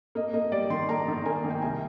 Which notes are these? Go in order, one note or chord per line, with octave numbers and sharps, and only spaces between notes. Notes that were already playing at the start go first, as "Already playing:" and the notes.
A#3 D#5
A#3 D#5
G3 D5
D#3 C6
A#3 A#5
D#3
A#3 G#5
D#3
G5
C2 G#5